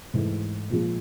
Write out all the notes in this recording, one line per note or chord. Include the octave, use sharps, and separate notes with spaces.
G#2 E3 A3
A#2 F3 G#3